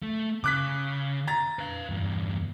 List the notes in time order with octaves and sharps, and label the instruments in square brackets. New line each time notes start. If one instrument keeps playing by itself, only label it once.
[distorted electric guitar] A3
[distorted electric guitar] C#3 [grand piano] D6 F#6 B6
[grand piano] A#5 A6
[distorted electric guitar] B4 F5
E2 G2